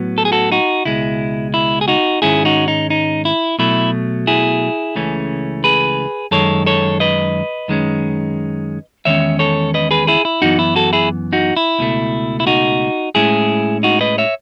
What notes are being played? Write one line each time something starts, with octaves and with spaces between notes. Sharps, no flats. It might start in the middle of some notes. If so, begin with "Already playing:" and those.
Already playing: A2 F#3 B3
A4
G#4
F#4 A4
D#4 F#4
C#2 B2 G#3 E4
E4
G#4
D#4 F#4
G#2 D#3 G#3 C#4 E4 G#4
D#4 F#4
D#4
D#4
E4
B2 F#3 A3 E4
E4 G#4
C#2 C#3 E3 A3 C#4
G#4 B4
F#2 D#3 G#3 A4 C#5
A4 C#5
B4 D#5
F#2 D#3 G#3 C#4
E2 D#3 G#3 C#4 C#5 E5
A4 C#5
B4 D#5
G#4 B4
E4 G#4
E4
F#2 E3 B3 D#4 F#4
E4
F#4 A4
E4 G#4
D#4 F#4
E4
C#2 B2 A3
E4
D#4 F#4
A2 G#3 C#4 E4 G#4
D#4 F#4
B4 D#5
C#5 E5